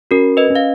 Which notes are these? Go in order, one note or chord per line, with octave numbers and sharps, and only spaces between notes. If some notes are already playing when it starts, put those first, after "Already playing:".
C#4 F#4 A#4
B4 D#5
C#4
F5